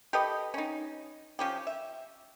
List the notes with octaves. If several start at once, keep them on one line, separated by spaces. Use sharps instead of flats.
G4 A4 B4 D#5
C#4 D#4
F3 C#4 G4
E5